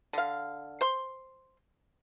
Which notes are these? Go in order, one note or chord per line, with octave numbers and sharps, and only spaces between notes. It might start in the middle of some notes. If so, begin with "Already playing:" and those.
D3 F5
C5 C6